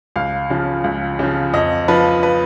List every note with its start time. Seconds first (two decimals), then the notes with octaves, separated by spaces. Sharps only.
0.16 C#2 F5
0.50 C#3 F3
0.84 C#2
1.19 C#3 F3
1.53 F2 D#5
1.88 F3 B4
2.23 B4